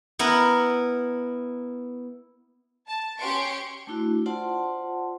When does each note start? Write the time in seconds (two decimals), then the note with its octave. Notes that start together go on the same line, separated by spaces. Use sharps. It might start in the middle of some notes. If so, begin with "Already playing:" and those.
0.19 B3 E4 A#4
2.87 A5
3.18 C#4 G4 C6 C#6 C#7 D7
3.87 A3 D4 E4 F#4
4.26 F4 C5 D5 F#5 A5 C6